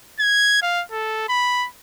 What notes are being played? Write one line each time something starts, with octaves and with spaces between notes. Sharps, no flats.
G#6
F5
A4
B5